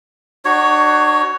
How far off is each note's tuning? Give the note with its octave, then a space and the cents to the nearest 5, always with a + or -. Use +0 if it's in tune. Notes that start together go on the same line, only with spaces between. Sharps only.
D4 +35 F#4 +20 C#5 +0